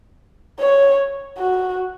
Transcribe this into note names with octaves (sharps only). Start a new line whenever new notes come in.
C#5
F#4